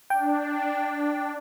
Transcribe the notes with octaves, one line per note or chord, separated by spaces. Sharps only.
D4 G5